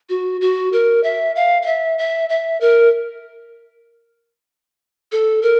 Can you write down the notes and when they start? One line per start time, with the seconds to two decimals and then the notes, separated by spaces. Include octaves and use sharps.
0.09 F#4
0.41 F#4
0.73 A#4
1.03 E5
1.36 F5
1.62 F5
1.66 E5
1.98 E5
2.29 E5
2.61 A#4
5.12 A4
5.42 A#4